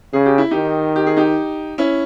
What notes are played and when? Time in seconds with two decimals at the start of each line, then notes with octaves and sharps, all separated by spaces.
0.13 C#3 G#4
0.26 G4
0.38 E4
0.51 D#3 D#4 G4
0.96 G4
1.07 G#4
1.17 D#4 G4
1.78 C#4 E4